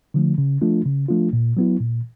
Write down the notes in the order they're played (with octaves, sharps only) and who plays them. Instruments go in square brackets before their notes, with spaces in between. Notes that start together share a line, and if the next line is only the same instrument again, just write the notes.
[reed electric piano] D3 F3 A3
C#3
F3 A3 D4 F4
C#3
F3 A3 D4 F4
A#2
F#3 B3 E4
A#2